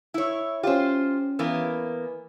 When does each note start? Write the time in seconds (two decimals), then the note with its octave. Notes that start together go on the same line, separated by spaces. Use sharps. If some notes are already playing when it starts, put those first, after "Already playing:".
0.14 E4 C#5
0.63 C#4 F4 G4 C5
1.39 E3 A#3 B3